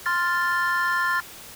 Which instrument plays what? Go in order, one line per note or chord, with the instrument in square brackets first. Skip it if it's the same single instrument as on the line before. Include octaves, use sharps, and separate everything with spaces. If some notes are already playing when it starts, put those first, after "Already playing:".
[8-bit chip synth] C6 F6 A6